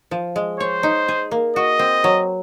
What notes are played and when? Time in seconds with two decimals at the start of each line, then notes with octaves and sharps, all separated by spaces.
0.11 F3
0.36 G#3
0.60 C5 C#5
0.83 D#4
1.08 G#4
1.31 A#3
1.56 F#4 D#5
1.79 C4
2.04 F#3